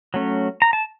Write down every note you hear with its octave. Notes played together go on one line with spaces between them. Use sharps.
F#3 A3 C#4
A#5
A5